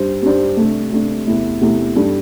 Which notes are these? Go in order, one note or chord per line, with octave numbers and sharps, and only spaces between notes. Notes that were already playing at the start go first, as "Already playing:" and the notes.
Already playing: G2 G3 D4 C5
G2 G3 D4 C5
C3 A3 D4
C3 A3 D4
E2 C3 A3 E4
E2 C3 A3 E4
G2 G3 D4 A4